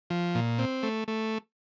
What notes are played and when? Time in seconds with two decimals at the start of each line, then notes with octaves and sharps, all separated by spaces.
0.10 F3
0.35 A#2
0.59 C4
0.83 A3
1.08 A3